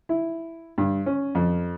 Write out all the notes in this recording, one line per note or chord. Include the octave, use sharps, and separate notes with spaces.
E4
G2
C#4
F2